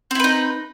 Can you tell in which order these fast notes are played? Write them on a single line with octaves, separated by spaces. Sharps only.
C4 E4 B4 D#4